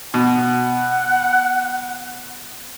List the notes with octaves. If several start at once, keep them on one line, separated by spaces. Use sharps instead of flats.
B2 F#5